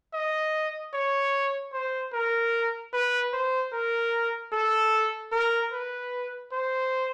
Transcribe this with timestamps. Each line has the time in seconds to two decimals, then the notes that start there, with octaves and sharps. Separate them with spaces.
0.13 D#5
0.93 C#5
1.73 C5
2.13 A#4
2.93 B4
3.33 C5
3.73 A#4
4.53 A4
5.32 A#4
5.72 B4
6.52 C5